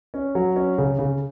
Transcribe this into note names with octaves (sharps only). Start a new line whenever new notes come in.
C#4
F#3
C#4
C#3
C#3